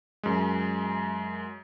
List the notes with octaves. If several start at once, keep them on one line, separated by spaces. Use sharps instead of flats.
F#2 G#3